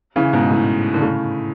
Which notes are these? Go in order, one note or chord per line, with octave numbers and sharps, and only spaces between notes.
C#3 E3
G#2 B2
A2
D3
A2 C#3